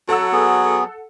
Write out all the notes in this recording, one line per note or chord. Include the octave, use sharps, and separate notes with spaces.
F#3 A4 F#5 E6
B3 G#4